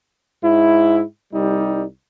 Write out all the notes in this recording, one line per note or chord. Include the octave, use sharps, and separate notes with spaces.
G#2 E4
C2 G3 D#4